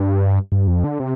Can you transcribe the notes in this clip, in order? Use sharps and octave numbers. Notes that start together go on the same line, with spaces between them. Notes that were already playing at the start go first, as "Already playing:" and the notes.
Already playing: G2
G2
F2
D3
C3